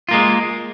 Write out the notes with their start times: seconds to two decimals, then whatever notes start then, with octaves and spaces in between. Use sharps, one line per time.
0.09 F4
0.11 A#3
0.14 G#3